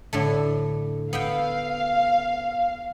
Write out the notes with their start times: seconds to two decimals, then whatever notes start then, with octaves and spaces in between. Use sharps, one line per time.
0.13 A2 D3 A3
1.13 B3 E5 F5 G5